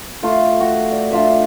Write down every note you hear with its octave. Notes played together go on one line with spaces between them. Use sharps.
A3 F4
F#4
D5
D4 F4 E5